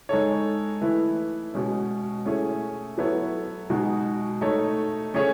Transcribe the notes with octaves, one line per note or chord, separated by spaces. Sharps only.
G#3 D#4 A4 C#5
E3 A3 E4 B4
B2 G#3 C#4
A3 C#4 E4 G#4 C#5
F#3 B3 E4 A4 C#5
B2 G#3 D#4 F#4
A3 D#4 A4 C#5
A3 C#4 G#4 C#5